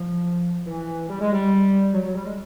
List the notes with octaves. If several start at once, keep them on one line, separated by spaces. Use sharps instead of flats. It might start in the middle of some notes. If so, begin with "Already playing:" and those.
Already playing: F3
E3
G3
G#3
G3
F#3
F#3
G3
G#3